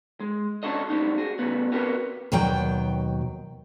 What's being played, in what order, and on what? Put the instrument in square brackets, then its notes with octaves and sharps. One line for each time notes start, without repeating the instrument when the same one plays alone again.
[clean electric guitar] G#3
C3 C#4 D4 F#4 A4 D#5
G3 A3 C4 C#4 D#4
F#4 G#4
C#3 G3 A3 B3
B3 C4 F#4 G4 A#4 B4
[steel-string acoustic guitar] D#2 B2 D#3 F#3 G5